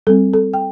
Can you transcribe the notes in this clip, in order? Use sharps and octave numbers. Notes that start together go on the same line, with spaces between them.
G3 C4 A4
A4
G5